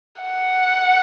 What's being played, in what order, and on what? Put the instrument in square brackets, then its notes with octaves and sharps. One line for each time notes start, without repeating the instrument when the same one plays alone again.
[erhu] F#5